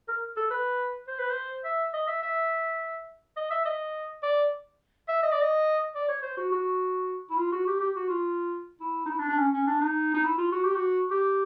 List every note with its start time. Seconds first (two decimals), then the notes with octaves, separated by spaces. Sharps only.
0.08 A#4
0.37 A4
0.50 B4
1.08 C5
1.19 B4
1.30 C5
1.65 E5
1.94 D#5
2.07 E5
2.23 E5
3.37 D#5
3.51 E5
3.66 D#5
4.23 D5
5.08 E5
5.23 D#5
5.32 D5
5.41 D#5
5.95 D5
6.08 C#5
6.23 C5
6.37 F#4
6.52 F#4
7.30 E4
7.37 F4
7.52 F#4
7.67 G4
7.80 G4
7.96 F#4
8.09 F4
8.81 E4
9.06 D#4
9.10 E4
9.19 D4
9.29 D4
9.38 C#4
9.53 C#4
9.67 D4
9.81 D#4
10.14 D#4
10.25 E4
10.38 F4
10.52 F#4
10.65 G4
10.76 F#4
11.11 G4